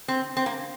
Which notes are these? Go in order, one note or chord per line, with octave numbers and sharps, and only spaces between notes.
C4
C4
A#3